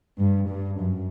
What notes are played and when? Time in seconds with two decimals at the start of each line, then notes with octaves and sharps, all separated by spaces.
0.18 G2
0.49 G2
0.80 F#2